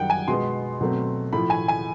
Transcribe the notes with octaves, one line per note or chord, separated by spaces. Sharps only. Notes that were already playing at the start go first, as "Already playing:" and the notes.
Already playing: F#2 D#3 G3 F#5 G5
G#5
B2 G#3 B3 C6
B2 F#3 A3 C4
A2 F3 A3 B5
G#5
G#5